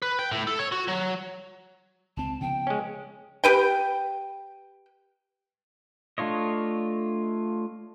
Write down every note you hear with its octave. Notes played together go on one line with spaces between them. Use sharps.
B4
G5
A2
A4
C#5
F#4
F#3
C#2 C4 A5
C#3 F3 B3 G5
G#3 C#4
G4 B4 G5
A3 D4 F4 C#5 D#5